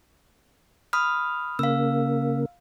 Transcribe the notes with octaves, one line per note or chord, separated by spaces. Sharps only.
B5 D#6 F6
C#3 A#3 F5 E6